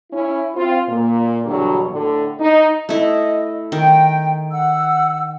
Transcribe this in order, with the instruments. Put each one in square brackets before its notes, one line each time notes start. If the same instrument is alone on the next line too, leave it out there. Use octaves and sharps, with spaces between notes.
[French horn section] C#4 E4
C4 F4
A#2
E2 G2 B2 D3 F#3
A2 D3
D#4
[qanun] A3 E4 [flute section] D#5
[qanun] D#3 [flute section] G5
[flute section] F#5 E6